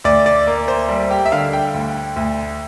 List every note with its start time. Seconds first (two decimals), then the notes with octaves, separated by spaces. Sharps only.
0.04 D2 D5
0.26 D5
0.47 A#3
0.68 C5
0.89 G3
1.11 G4
1.26 E5
1.32 D3 F5
1.53 G5
1.74 D2
2.16 D2